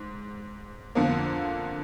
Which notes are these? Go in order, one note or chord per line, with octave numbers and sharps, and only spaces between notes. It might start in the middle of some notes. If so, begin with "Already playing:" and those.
Already playing: G#2
F2 D3 F3 A#3